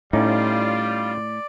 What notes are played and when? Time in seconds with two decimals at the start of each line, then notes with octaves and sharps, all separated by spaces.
0.13 A2 G3 C#4 D#4 F4 D5